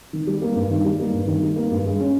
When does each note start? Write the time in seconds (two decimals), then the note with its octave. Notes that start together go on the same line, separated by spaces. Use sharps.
0.13 D#3
0.27 G3
0.42 A#3
0.56 G2
0.71 D#3
0.85 G3
0.99 A#3
1.13 G2
1.28 D#3
1.43 G3
1.56 A#3
1.71 G2
1.86 G#3
2.00 C#4